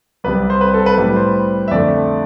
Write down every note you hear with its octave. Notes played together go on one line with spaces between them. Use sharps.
C2 C3 G3 B4
C5
B4
A4
B4
A2 G3 B4
C5
E5
F2 D3 A3 D5